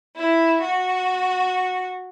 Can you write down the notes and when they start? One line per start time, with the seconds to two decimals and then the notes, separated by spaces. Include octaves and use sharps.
0.16 E4
0.61 F#4